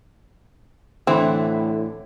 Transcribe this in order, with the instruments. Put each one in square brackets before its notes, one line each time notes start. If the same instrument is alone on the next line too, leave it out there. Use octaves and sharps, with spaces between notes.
[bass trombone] A2 [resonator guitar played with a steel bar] D3 E3 E4 [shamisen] C4